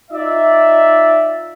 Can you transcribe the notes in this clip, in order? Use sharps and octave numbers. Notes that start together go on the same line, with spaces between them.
D#4 F4 D5 E5